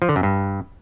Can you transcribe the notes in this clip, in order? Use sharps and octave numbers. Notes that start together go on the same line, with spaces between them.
F3
D3
F#2
G2